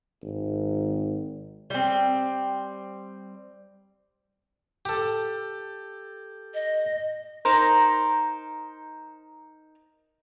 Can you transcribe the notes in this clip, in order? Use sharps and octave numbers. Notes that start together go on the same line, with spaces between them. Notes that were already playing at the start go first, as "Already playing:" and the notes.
G#1
G3 C4
G4 A4
D#5
D#4 A#4 C5